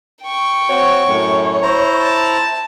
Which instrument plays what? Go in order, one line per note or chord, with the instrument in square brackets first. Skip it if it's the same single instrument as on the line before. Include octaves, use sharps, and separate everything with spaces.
[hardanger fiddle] G5 C#6
[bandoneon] C4 F#4 [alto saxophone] C#5
[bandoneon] F#2 A2
E4 C5 A#5
[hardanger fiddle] A5